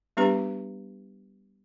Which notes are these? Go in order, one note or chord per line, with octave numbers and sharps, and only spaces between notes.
G3 B3 D4 G4 B4 A#5